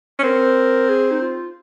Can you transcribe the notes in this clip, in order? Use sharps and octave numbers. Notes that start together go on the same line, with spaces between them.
C#4
C4 A#4
G#4
D#4
F4